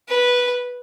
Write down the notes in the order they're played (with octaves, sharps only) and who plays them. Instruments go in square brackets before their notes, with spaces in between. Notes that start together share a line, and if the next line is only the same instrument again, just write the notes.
[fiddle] B4